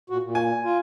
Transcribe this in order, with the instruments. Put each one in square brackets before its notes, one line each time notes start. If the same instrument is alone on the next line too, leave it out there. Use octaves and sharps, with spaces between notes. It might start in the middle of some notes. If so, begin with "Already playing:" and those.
[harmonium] A#2 F#4
A#2
[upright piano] G#5
[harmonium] F4